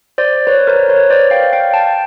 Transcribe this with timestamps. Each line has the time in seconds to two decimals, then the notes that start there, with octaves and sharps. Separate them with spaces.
0.18 C5 D5
0.47 B4 C#5
0.67 A#4 C5
0.89 B4 C#5
1.10 C5 D5
1.31 F5 G5
1.52 F5 G5
1.73 G5 A5